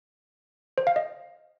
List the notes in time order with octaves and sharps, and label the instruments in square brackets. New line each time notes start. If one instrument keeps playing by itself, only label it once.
[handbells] C5
F5
D#5